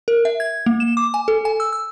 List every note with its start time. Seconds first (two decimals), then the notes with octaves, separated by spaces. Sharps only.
0.08 A#4
0.25 E5
0.40 G#6
0.66 A#3
0.80 E7
0.97 D6
1.14 G#5
1.28 A4
1.45 G#5
1.60 E6
1.72 E6